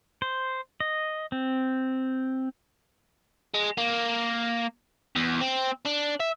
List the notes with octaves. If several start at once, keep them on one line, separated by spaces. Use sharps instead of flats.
C5
D#5
C4
G#3
A#3
E2
C4
D4
E5